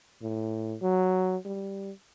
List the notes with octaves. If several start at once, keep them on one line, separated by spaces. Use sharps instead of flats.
A2
F#3
G3